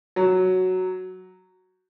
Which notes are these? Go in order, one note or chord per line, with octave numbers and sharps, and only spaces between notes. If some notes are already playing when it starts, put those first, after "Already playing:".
F#3